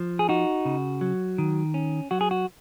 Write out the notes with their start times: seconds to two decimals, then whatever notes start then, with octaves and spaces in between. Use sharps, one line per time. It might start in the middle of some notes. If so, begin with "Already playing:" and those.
Already playing: F3
0.19 G#4
0.29 D#4 F#4
0.65 C#3
1.01 F#3
1.38 D#3
1.74 C#4
2.11 F#3 F#4
2.21 G#4
2.31 F#4